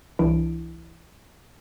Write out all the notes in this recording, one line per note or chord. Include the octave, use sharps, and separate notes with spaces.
C2 E3 D4 E4 D7